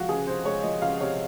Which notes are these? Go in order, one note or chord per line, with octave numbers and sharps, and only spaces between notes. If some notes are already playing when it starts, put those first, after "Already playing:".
Already playing: C3 F3 G#3 F#4 F5
C#2 G#4
C3 C5
G#3 C#5
F3 D#5
C#2 F5
C3 C#5